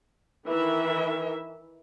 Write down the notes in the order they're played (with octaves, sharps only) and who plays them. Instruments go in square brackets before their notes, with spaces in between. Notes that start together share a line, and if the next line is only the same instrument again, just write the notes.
[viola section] D#3 E3 A#4 E5